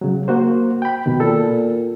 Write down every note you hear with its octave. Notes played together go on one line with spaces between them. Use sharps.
C#3 F#3
A#3 F#4 C5
G5 B5
B2 D#3
A#2 A4